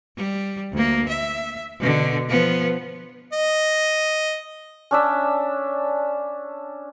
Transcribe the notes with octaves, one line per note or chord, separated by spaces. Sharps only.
G3
D2 A#3
E5
B2 D3
F3 B3
D#5
C#4 D4 E5